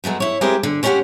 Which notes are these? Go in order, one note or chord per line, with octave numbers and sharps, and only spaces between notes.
F#3 G#3 A3 B3
E4 C#5
G#3 C4 E4 G4 G#4 A#4
D3
G#3 C#4 D4 F#4 G4 F#5